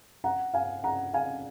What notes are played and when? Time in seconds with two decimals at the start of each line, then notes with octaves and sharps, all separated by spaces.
0.24 F#5 A#5
0.54 F5 G#5
0.83 F#5 A#5
1.14 F5 G#5